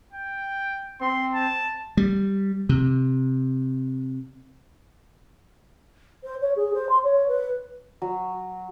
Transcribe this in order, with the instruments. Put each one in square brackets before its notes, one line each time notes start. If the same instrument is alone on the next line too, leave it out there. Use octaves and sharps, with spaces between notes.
[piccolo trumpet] G5
[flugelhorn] C4 [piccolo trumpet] C6
[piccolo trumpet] A5
[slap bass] G3
C3
[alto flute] C5
C#5
G#4
C5
C6
C#5
B4
[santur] F#3